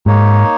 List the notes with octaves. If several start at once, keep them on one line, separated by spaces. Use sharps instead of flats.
G#2 A#3 D#4 C#5